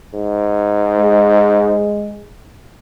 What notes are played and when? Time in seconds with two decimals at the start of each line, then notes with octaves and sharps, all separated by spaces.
0.14 G#2
0.99 G#3